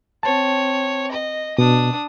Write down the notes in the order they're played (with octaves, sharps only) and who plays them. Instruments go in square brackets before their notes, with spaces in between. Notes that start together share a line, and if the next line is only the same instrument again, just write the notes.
[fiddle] C4 C#5 [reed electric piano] A5
[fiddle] D#5
[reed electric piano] B2 [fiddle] D4 D#6